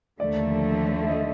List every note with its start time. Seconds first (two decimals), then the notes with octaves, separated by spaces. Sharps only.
0.20 D#2 D3 F3 A3 D5
1.02 E5
1.09 D#5